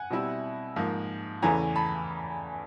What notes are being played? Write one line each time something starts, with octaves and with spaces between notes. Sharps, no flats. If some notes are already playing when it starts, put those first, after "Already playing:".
Already playing: F#5 G#5
B2 G3 C4 E4
G#2 F3 A#3
E2 C#3 E3 A3 G#5 A#5
A5 B5